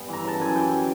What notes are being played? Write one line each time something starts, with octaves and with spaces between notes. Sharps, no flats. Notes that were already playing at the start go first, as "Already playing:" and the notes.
Already playing: G2 B3 G#5
E3 A#5
C#3 A5
F#2 G#5
E3 G5
E3
G#5